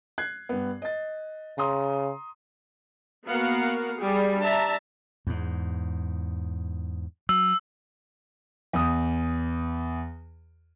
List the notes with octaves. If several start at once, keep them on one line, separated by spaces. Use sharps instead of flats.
F#6 G#6 C7
G2 B3
D#5 A6
C#3 A#5 C6 D#6
A#3 B3 F#4 A#4 F5 F#5
G3 G4 G#4
D4 E5 A5 A#5
E2 G#2
F#3 E6
E2 D#6